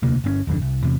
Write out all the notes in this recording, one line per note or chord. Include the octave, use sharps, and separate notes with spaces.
E1 D2 C3 A#3
G1 C4 C#4
D#1 G#1 F2 D3
C2
E2 C3